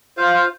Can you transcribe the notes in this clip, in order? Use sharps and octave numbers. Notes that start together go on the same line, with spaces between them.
F4 C5 F5